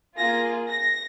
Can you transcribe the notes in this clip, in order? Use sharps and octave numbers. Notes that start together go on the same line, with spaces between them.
A#3 F4 G#4 A#6
A#6